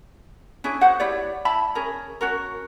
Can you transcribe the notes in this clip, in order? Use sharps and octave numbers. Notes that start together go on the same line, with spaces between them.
C#4 D4 E4 G#4
F#4 G#4 C5 F#5
E4 G4 C#5 D5
E4 A5 B5
C#4 G#4 A#4
C#4 F#4 A#4